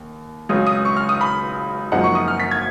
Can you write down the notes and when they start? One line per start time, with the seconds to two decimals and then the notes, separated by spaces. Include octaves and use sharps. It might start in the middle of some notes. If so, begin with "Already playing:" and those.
Already playing: D#2
0.49 C#2 C#3 F#3 C#4 D#6
0.67 D#6
0.85 C#6
0.97 F6
1.09 D#6
1.21 B5
1.92 F#1 F#2 F3 G#3 D#4 F#5
2.04 C#6
2.15 D#6
2.28 F6
2.40 B6
2.51 G#6